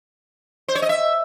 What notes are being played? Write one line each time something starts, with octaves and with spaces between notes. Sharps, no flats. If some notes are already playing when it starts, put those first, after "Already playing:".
C5
C#5
D#5
E5